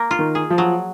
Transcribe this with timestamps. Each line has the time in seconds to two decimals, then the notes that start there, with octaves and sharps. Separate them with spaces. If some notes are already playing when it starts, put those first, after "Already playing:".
Already playing: A#3
0.11 F4
0.19 D#3
0.35 G#4
0.50 F3
0.58 F#3